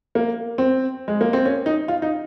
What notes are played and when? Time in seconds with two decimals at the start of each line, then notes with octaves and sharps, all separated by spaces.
0.15 A#3
0.58 C4
1.08 G#3
1.21 A#3
1.33 C4
1.45 C#4
1.66 D#4
1.88 F4
2.02 D#4